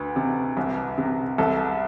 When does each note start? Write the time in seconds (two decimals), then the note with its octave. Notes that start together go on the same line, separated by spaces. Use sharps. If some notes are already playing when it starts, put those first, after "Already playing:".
Already playing: D2 B4
0.16 C3
0.57 C2
0.98 C3
1.38 C2 A4